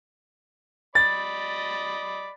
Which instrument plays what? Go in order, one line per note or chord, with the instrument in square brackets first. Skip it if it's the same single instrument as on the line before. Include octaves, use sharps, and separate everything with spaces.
[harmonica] D5 D#5 B5 [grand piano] A6